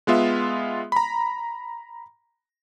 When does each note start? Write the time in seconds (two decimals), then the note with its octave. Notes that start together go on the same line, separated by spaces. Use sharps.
0.07 G#3 B3 F4 E5
0.92 A#5 B5